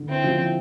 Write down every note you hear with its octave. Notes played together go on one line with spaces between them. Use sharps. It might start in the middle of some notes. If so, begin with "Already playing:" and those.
Already playing: D3
C4 E4
F3
E4